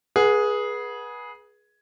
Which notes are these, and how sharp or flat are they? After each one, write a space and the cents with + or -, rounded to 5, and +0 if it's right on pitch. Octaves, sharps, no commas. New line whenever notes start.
G#4 +5 B4 -30 F#5 +0